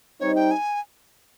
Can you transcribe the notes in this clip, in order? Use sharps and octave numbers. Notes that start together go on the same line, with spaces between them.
G3 C4 D#4 C#5
G5
G#5